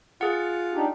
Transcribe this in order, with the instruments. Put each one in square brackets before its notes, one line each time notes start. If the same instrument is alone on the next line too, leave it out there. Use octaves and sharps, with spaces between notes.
[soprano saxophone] F4 [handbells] G#4 F#5
[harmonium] D4 D#4 G4